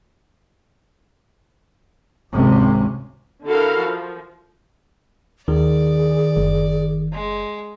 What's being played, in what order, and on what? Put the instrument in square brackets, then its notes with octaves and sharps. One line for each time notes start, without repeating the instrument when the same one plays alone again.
[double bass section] G#1 C#2 C3 C#4
[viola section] D3 E4 F#4 A4 A#4 F5
F3
[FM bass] D#2 [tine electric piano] D#3 [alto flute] G#4 [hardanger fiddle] D5
[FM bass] F#1
[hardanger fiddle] G#3